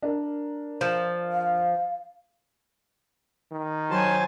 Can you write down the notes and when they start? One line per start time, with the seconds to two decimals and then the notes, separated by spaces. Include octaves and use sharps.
0.03 D4 A#4
0.81 F3
1.32 F5
3.52 D#3
3.90 F#3 C5 G#5 A5